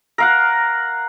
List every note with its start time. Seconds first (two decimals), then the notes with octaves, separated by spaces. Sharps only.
0.18 A#4 F5 F#5